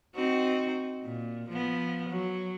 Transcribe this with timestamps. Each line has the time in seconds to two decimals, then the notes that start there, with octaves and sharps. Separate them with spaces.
0.15 C4 D#4 F#4
1.04 A#2
1.49 F3 B3
2.09 F#3